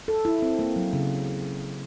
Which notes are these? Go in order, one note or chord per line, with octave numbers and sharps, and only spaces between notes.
A4
E4
C4
A#3
F#3
C#3